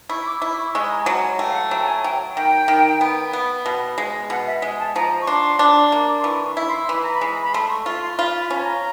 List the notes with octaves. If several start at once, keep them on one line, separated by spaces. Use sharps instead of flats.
E4 C#6
D6
E4
D6
C#6
G#3 C#6
A#5
G#5
F#3 A5
G#5
A3 G5
F5
F#5
G#5
F#3 G5
A5
G#5
F#3 G5
D#3 G5
D#3
B3
B3
B2
G#3
B2 F#5
E5
G#3
A5
F3 A#5
C#6
D4 C6
D4
A#3
C6
E3 C#6
C#6
E4
C6
E3 B5
A#5
B5
G#3
B5
A3 C6
C#6
F4 C#6
C6
F4 B5
B5
C#4
A5
A#5